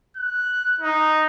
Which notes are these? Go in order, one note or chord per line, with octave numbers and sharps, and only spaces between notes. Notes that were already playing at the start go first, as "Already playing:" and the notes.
F#6
D#4